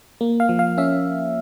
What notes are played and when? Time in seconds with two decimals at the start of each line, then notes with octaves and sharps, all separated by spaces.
0.21 A#3
0.40 F5
0.49 F3
0.59 F5
0.78 C#4 E5